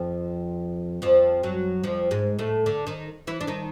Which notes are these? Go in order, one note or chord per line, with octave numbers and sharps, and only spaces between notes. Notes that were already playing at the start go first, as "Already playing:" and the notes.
Already playing: F2 F3
F2 F3
F#2 F#3
F2 F3
G#2 G#3
A2 A3
D3 D4
D#3 D#4
E3 E4
D4
D#3 D#4